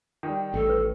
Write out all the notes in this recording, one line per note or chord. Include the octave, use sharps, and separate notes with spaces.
D#3 G3
A1 A4
B4